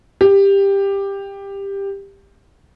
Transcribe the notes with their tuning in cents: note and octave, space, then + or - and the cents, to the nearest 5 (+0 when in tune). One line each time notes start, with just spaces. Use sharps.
G4 +15